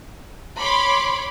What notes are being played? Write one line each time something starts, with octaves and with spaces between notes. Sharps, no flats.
C#5 B5 C6 D6